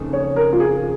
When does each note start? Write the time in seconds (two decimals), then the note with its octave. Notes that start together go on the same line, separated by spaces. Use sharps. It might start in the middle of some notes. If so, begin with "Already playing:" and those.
Already playing: F2 C#3 A#3 D#4
0.13 C#5
0.36 A#4
0.52 F4
0.60 G#4